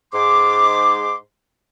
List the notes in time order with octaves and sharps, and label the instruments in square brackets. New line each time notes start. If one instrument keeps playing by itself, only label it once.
[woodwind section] G#2 C6 D6